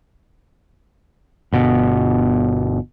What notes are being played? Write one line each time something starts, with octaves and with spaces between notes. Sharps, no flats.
G1 B2